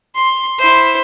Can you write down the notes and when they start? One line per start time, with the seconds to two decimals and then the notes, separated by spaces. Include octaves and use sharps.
0.15 C6
0.59 E4 C5